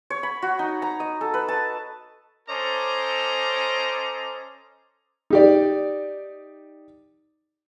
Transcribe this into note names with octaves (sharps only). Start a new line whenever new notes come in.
C#5
B5
F#4
D#4
A#5
D#5
A4
B4
A5
C#4 A4 C5 D#5 A#5 D6
D#4 G4 D5